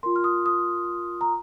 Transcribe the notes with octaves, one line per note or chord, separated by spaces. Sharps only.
F4 A#4 C6
F6
D#6
D#6
A#5